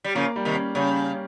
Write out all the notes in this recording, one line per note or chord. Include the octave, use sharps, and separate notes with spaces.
G3
C#3 F3 A#3
G3
C3 D#3
C#4
C#3 G3